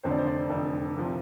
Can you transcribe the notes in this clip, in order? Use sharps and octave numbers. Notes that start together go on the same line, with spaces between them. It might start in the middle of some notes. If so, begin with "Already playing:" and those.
F1 F2 D3 C5
D5
C5
D5
F1 F2 D3
C2 C3 F3